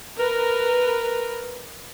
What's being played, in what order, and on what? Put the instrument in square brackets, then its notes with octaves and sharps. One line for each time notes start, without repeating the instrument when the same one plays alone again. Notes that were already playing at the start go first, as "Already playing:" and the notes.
[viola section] A#4 B4